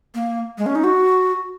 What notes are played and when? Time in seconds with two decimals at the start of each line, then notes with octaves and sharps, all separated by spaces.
0.15 A#3
0.58 G#3
0.66 C#4
0.75 D#4
0.84 F#4